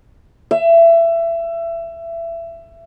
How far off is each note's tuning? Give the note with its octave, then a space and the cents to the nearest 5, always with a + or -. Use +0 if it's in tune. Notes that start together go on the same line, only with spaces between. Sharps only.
E5 +25